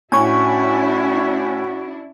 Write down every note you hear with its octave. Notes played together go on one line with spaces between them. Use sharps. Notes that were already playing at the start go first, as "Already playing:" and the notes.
A2 C#4 D4 E4 F#4 G#5 C#6